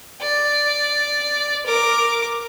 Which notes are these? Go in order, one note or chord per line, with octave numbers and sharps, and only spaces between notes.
D5
A#4 D6